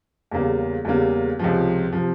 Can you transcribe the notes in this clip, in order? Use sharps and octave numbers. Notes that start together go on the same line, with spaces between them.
E2 C#3 G3 A#3
E2 C#3 G3 A#3
C#2 C3 F3
C3 F3